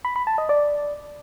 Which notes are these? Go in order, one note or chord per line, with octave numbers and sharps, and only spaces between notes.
B5
B5
A5
D#5
D5